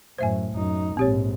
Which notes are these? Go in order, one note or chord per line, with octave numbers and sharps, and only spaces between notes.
F#2 A2 C5 E5 G#5
F#2 D#4
A#1 G#2 C4 G4 C#5